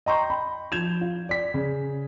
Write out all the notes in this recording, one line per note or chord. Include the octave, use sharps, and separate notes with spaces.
D#5 G5 A#5 C6 C#6 G6
B5
F3 G6 G#6 E7 F7
F4
D5 B6
C#3